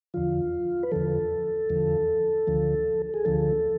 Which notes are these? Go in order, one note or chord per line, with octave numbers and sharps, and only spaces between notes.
E2 D3 F3 F4
B4
E2 D3 F3 A4
E2 D3 F3
D2 D3 F3
G#4
D2 D3 F3 A4